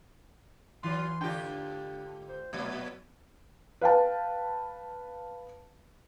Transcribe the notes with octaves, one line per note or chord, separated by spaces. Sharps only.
E3 F#3 F4 C6
G#2 D3 D4 F4 G4 G5
C5
A#2 F#3 A3 B3
B4 F5 G5 A5